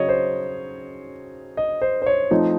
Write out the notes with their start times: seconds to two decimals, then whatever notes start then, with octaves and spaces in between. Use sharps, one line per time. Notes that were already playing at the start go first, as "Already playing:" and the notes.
Already playing: C#3 F#3 C#5 D#5
0.09 C5
1.57 D#5
1.82 C5
2.02 C5
2.06 C#5
2.31 F3 A3 C4 D#4 D#5